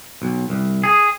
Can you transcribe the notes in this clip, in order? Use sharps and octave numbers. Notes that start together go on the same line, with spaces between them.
B1
C2
G#4